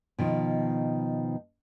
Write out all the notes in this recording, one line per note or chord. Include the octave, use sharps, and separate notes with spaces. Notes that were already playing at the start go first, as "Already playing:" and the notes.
B2 D#3 F3